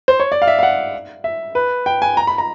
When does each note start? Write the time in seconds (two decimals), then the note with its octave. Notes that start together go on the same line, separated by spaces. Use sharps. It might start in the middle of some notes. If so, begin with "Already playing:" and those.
0.08 C5
0.20 C#5
0.32 D5
0.42 F5
0.47 E5
0.59 F5
0.63 F#5
1.24 E5
1.55 B4
1.86 G5
2.02 G#5
2.17 A#5
2.27 B5
2.38 A#5